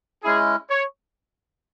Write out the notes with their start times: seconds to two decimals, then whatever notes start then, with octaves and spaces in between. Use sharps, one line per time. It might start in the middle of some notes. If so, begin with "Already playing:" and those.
0.24 G#3 C#4 E4 G#4
0.70 C#5